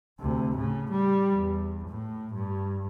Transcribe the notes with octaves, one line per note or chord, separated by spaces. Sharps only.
D2 C3
A2 C#3
G3
E2
A2
G2